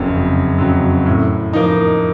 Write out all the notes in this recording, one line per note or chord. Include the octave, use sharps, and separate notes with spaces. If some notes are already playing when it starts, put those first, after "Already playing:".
Already playing: F#1 F2 C#3 F#3
F#1
F2 C#3 F#3
A2
F3 A#3 D#4